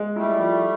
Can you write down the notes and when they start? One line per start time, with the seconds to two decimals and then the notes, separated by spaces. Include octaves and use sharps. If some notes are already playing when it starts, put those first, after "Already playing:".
Already playing: G#3
0.16 G3 A3 E4
0.40 F3